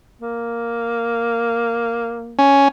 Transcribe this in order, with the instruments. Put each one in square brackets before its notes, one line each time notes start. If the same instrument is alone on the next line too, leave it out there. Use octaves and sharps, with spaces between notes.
[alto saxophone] A#3
[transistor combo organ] C#4